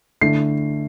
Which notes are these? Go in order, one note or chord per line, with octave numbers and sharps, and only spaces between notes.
D3 A3 E4 C7